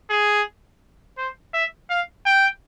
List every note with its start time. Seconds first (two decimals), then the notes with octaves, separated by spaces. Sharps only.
0.10 G#4
1.18 C5
1.54 E5
1.90 F5
2.26 G5